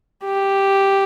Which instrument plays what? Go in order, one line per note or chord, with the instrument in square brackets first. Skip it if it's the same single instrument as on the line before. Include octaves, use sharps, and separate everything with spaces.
[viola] G4